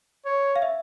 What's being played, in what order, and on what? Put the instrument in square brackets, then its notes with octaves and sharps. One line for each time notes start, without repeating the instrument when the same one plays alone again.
[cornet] C#5
[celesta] F5
E5